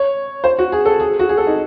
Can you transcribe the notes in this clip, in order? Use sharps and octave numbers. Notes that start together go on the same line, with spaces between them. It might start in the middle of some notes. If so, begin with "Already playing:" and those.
Already playing: C#5
C5
F#4
G#4
A4
G#4
F#4
G#4
A4
D#4